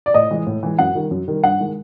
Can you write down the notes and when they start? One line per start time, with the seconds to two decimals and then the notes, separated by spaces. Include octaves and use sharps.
0.06 D5
0.14 A2 D#5
0.31 E3 G#3
0.47 A2
0.63 E3 G#3
0.78 F#2 F#5
0.95 D#3 G3
1.11 F#2
1.28 D#3 G3
1.43 G2 F#5
1.60 D#3 G#3